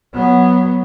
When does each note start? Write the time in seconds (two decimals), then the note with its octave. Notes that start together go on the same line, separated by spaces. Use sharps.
0.14 F#3 B3